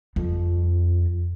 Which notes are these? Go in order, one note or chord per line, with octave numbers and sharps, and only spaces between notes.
F2